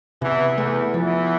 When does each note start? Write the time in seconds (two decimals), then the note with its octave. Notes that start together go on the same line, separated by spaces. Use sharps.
0.22 E2 C3 E3
0.58 E2 E3 A3
0.94 E2 E3 F3